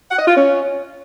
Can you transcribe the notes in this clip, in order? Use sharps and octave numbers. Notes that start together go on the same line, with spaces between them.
F#5
D#5
F4
C#4